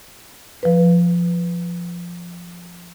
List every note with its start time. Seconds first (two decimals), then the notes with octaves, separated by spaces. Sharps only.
0.63 F3 B4